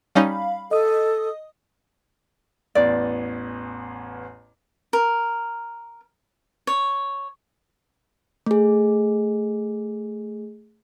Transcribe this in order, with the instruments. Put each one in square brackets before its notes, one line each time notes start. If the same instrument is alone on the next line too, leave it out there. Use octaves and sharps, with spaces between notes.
[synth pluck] G3 C#4 D#4 [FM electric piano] F5 B5
[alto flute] A4 [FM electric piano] D#5 D#6
[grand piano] A1 E2 [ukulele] D5
[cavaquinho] A#4
C#5
[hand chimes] A3 G#4